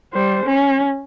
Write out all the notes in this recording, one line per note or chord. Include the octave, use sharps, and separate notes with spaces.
G3 C5
C#4